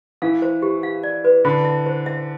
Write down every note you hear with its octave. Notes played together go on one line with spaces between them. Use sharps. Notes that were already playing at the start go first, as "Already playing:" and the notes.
E3 F5
C5
G4
F5
D5
B4
D3 B5
E5
C5
E5